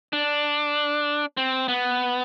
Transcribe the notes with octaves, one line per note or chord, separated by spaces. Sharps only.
D4
C4
B3